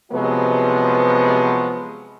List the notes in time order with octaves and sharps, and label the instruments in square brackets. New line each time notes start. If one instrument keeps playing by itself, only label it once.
[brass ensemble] C3 F3 F#3 G#3 B3